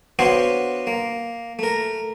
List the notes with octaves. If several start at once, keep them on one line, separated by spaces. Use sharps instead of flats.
B3 D4 F#4 C5 C#5 F5
A#3
A3 A#4